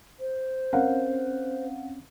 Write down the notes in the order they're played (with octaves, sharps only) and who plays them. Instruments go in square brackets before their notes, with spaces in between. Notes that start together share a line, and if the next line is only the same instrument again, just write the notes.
[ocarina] C5
[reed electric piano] C4 C#4 [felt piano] A#4 F5 F#5